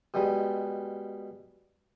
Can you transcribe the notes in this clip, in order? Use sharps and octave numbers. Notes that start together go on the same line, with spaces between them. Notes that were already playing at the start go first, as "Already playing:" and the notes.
B2 G3 G#3